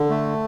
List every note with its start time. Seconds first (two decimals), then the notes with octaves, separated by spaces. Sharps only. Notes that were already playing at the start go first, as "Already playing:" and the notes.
Already playing: D3
0.10 A3